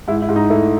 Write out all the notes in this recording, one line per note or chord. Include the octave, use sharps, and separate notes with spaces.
G#2 E4
E4
G#2
D#4
A3 E4